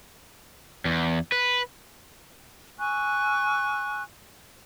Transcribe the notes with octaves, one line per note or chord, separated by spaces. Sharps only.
E2
B4
G#5 C#6 E6 F#6